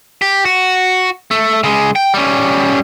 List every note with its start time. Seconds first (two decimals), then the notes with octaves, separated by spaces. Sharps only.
0.22 G4
0.45 F#4
1.31 A3
1.64 C#3 G#3
1.96 G5
2.14 G3 C#4